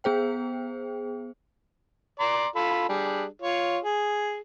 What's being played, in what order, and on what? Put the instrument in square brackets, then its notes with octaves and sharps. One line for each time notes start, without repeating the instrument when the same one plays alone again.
[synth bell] B3 G#4 C5 G5
[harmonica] D5 A#5 C6
F4 A4 B5
G3 D4 G#4
F4 C#5
G#4